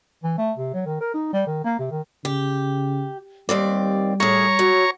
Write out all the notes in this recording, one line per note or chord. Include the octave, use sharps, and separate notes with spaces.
E3
A3
C3
F#3
D#3
A#4
D#4
G3
D#3
A#3
C3
D#3
C#3 G4
D#2 G3 C4 D5
A2 G#4 C#5 A#5 C#6
F#3